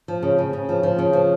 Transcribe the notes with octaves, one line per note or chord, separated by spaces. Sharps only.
F3
C#3
C#3
C#3
F3
F3
C#3
F3